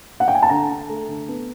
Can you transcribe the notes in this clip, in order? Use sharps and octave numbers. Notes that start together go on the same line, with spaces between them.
F#5
G5
G#5
A5
D3 A#5
D3
A3
D3
B3